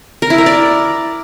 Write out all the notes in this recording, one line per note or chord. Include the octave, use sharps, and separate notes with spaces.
A#4
E4
A#4
D5